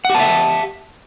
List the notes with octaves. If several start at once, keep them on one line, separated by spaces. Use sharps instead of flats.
G4 E5 F#5 A5